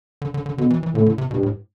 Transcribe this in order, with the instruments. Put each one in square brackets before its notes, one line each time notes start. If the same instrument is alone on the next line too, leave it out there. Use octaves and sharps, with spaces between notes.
[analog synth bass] D3
D3
D3
[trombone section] B2 [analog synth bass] D3
[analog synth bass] E3
E3
[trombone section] A2 [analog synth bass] D3
[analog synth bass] D3
C3
[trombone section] G2 [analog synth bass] B2
[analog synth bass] A2